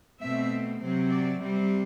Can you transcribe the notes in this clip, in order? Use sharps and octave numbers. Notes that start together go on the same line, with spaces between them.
B2 A3 C4 E5
C3 F#3 C4
D5
C3 G3 C4